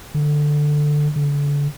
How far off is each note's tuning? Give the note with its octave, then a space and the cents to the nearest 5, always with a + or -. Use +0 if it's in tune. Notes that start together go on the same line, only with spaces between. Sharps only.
D3 +10
D3 -35